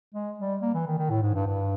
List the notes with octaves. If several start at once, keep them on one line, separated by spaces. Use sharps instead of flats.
G#3
G3
A#3
E3
D#3
D#3
A2
G#2
G2
G2